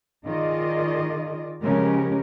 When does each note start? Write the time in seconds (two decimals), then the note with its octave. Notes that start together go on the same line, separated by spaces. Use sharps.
0.24 D#3 F4 G#4 D5 D#5
1.63 C#3 F3 G#3 C#4 G4 A#4